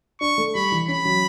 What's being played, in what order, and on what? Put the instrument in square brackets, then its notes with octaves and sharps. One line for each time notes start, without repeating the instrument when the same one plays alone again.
[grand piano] D4 [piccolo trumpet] C#6
[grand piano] A3
[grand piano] G3 [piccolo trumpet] B5
[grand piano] E3
[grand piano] C#4 [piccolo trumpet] B5
[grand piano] F#3